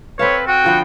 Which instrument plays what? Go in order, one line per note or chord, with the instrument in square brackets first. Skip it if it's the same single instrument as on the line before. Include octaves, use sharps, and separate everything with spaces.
[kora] C4 A4 F5 [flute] B4 [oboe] C#5
[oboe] F#4 [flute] G5
[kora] D3 F3 B3